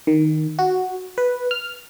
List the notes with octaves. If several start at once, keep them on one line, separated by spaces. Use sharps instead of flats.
D#3
F#4
B4
F6